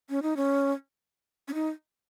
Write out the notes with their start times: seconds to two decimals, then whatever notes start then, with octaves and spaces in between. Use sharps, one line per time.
0.10 C#4
0.22 D#4
0.37 C#4
1.48 C#4
1.54 D#4